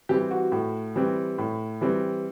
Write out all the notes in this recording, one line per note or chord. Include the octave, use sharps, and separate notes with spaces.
E3 G3 C4 G4
F#4
A2
E3 G3 C4
A2
E3 G3 C4